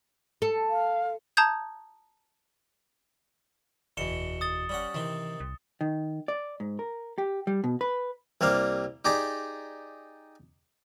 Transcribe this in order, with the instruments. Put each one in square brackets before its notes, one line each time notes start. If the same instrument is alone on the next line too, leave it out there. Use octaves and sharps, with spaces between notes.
[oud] A4
[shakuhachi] F5
[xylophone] A5 A#5 D#6 G6 G#6
[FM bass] F#1 [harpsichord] E2 B2 E3 [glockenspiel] C#7 E7 G7
[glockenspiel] D#6 A6 G7
[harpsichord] G3 C#4 F#5
[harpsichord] C3 D#3 C4 [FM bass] E3
[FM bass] C2
[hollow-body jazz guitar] D#3
D5
G#2
A#4
G4
G3
B2
B4
[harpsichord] C2 G3 A#3 F5
D#4 G4 G#4 D5